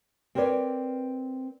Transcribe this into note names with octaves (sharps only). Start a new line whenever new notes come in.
C4 A#4 B4 C#5 D5